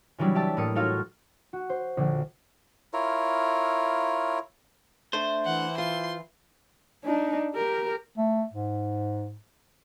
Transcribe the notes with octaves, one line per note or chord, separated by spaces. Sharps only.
C#3 E3 F#3 G3 D4
G4 D5 E5 A5
A2 A#3 D#6 C#7
D#4 F4 F#4 A4 C#5 F5
F#4
C5
A#1 D3
E4 F4 A#4 C#5
A3 D4 C5 E5
E3 F#5
F4 C6
D4 D#4
G4 A#4
A3
G#2